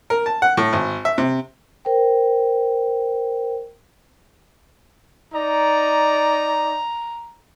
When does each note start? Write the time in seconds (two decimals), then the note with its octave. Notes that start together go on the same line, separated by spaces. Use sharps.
0.10 A#4
0.26 A5
0.42 F#5
0.57 A2
0.73 G#1
1.05 E5
1.18 C3
1.85 A#4 C5 G5
5.34 D#4 D5 A#5